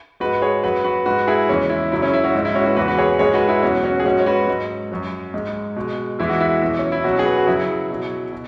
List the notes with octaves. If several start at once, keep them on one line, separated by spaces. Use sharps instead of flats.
G#2 G#3 F#4 B4
G#4 C#5
F#2 F#3 F#4 B4
F#4 B4
G#2 G#3 F#4 B4
E4 G#4
E2 C#3 E3 G#3 C#4
E4
F#2 C#3 F#3 E4
C#4
E4
C#4 F#4
G#2 G#3
E4
C#4 F#4
F#4 B4
E2 C#3 E3 F#4 B4
F#4 B4
G#4 C#5
G#2 G#3 G#4 C#5
F#4 B4
E4 G#4
E2 B2 F#3 C#4 F#4
C#4 F#4
G#4
G#2 F#3 C#4 F#4
C#5
F#4 B4
G#2 F#3
F#2 F#3
G#2 G#3
B2 G#3
E2 E3 G#3 E4
F#4
E4
E2 B2 F#3
C#4
E4
B2 F#3 C#4 F#4
G#4
F#4 B4
F#4
F#2 C#3 F#3 E4 G#4
B2 F#3
B2